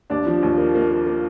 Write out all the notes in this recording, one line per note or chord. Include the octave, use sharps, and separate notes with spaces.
D#2 D4 D5
F3
D#2
A#3
A#3
A#3
A#3